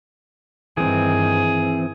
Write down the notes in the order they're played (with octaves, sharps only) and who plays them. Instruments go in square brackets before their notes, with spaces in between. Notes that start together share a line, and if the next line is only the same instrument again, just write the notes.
[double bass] G2 D#3 [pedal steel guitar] E3 C4 [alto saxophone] G#4